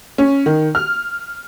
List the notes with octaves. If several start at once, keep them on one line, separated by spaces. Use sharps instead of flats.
C#4
D#3
F6